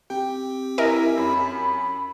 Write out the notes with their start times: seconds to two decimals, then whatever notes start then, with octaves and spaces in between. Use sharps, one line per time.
0.10 C4 G4 G5
0.78 E4 A#4 D#5 E5 G#5
1.17 F#2 B5